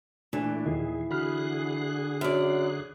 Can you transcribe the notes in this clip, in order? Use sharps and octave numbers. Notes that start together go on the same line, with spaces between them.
A#2 E3 A3 D4
D#2 A#2 D#3 G#4
D3 F#4 G#4 B5 F6 F#6
F#2 D5